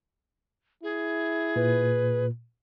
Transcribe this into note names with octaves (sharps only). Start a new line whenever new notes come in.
E4 G#4
A#2 B4